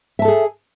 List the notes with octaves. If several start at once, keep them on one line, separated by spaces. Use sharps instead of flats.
G#4 A4 E5 A5